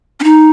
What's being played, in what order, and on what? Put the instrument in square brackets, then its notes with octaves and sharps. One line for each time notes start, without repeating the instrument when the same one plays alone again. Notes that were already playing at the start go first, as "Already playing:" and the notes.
[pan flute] C#4
D#4